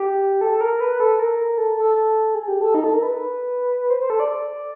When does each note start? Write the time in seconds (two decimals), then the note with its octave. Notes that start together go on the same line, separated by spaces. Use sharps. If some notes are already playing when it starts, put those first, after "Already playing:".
Already playing: G4
0.41 A4
0.51 A4
0.61 A#4
0.80 B4
1.00 A4
1.19 A#4
1.58 A4
1.78 A4
2.35 G#4
2.48 G4
2.61 A4
2.74 D#4
2.84 A4
2.94 A#4
3.03 B4
3.90 C5
4.00 C5
4.10 A4
4.20 D5